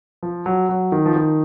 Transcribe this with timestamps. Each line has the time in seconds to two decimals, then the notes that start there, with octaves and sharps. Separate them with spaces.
0.23 F3
0.46 F#3
0.69 F#3
0.92 D#3
1.06 F3
1.16 D#3